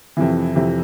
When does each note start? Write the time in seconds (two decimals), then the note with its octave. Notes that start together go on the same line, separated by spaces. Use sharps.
0.17 F2 C3 E3
0.55 F2 C3 E3